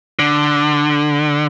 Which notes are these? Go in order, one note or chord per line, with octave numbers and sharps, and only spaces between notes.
D3